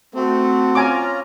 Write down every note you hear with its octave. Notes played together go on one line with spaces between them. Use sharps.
A3 C4 F#4
C#4 F4 G#5 A#5 D6